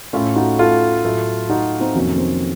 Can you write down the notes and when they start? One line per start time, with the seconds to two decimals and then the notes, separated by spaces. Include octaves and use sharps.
0.13 A2 A3 C#4 F4
0.36 D#4 F#4
0.59 F4 A4
1.04 A2 F#3 A3
1.50 D#4 F#4
1.80 C4 D#4
1.95 F2 C3 D#3 F#3 A#3 C#4
2.18 C4